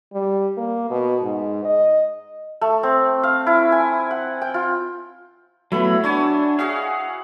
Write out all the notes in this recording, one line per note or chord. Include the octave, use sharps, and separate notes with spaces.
G3
A#3
B2
G#2
D#5
A3
C4
F5
E4
G#5
F#5
G5
F4
F#3 A3 B3 E4 B5
D4 F#4 C#5 G#5
F#4 G#4 F5 F#5